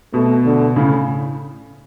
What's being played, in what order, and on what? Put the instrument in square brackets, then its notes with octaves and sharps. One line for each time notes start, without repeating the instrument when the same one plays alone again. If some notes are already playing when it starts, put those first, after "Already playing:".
[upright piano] B2 [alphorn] A3
[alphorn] D3
[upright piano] A2 C#3